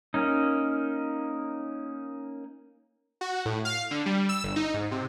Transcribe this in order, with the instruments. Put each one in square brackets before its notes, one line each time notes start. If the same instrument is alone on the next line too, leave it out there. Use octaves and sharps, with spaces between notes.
[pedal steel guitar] A#3 C#4 D#4
[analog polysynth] F#4
A2
F5
D3
G3
E6
G1
D#4
G#2
C3